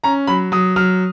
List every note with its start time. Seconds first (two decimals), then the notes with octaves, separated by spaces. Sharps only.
0.04 C#4 A#5
0.27 F#3 B5
0.52 F#3 D#6
0.76 F#3 F6